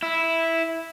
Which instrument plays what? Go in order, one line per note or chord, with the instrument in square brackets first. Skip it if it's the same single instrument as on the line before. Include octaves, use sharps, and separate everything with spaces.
[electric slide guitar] E4